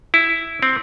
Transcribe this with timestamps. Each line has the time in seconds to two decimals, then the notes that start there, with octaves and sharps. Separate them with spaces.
0.14 E4
0.63 C4